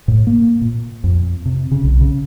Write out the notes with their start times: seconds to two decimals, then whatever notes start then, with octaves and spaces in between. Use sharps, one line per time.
0.08 A2
0.27 A#3
0.61 A#2
1.04 F2
1.46 C3
1.71 C#3
1.84 B1
2.01 C#3